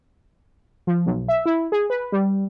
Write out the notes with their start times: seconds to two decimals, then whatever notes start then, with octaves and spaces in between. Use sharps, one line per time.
0.87 F3
1.06 B1
1.28 E5
1.46 E4
1.72 G#4
1.90 B4
2.12 G3